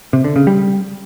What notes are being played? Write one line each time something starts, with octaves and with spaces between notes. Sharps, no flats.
C3
D3
C#3
G3